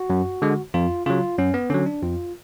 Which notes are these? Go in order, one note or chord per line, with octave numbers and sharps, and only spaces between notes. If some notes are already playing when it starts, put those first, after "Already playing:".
Already playing: F#4
F#2
D3 G#3
F2 F4
C#3 F#3 F4
F#2 C#4
B3
D3 F#3 C#4
D4
F2 F4